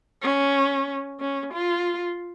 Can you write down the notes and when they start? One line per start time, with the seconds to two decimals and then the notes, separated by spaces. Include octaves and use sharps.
0.22 C#4
1.20 C#4
1.53 F4